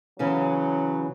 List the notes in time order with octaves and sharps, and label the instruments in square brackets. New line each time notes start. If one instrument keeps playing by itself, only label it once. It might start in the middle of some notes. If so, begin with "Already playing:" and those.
[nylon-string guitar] C#3 E3 C#4 [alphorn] F#3